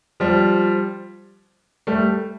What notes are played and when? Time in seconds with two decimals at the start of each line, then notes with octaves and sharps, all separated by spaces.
0.20 F3 G3
1.87 G3 A3